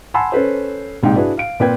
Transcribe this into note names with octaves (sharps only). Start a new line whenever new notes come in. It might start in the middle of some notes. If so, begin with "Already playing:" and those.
F#5 G#5 A5 B5 C6 E6
C#4 A4 B4 C5
A#1 G#2 C3 G5
D4 E4 F#4 G#4 B4
F5 D7
A#2 C4 B4 G5 G#6